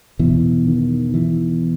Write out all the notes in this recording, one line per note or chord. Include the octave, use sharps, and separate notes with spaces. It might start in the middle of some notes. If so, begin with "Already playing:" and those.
E2 B2 E3
D#3
E3